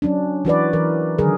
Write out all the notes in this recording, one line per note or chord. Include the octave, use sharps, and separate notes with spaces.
F#3 C#4 D4
E3 F#4 B4 D5
E3 A#4
D3 D#3 F#3 G#4 A#4